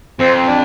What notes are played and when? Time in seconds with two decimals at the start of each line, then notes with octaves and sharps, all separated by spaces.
0.19 F2 C4
0.48 D4